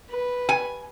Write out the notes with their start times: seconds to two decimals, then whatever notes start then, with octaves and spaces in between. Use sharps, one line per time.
0.10 B4
0.49 G#5